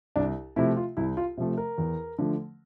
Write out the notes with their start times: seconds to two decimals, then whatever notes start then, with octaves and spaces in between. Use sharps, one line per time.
0.16 C2 D4
0.56 C3 F3 A3 E4
0.77 F4
0.97 C2 E4
1.17 F4
1.37 C3 F3 A3
1.57 A#4
1.78 E2
2.18 D3 F3 A3